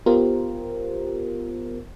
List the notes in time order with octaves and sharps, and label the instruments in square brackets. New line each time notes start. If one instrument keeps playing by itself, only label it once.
[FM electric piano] B3 F4 G4 A#4 C5